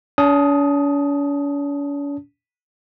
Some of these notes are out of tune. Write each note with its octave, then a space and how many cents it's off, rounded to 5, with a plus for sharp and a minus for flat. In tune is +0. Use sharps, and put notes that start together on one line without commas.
C#4 +45 A5 +10 D#6 +10